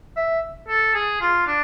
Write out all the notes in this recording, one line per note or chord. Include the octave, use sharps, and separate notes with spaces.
E5
A4
G#4
F4
D4